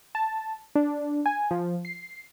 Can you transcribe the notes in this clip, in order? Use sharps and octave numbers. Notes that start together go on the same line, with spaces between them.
A5
D4
G#5
F3
C7